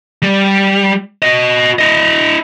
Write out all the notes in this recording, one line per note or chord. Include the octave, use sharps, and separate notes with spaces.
G3
F#4 D#5
E4 D#5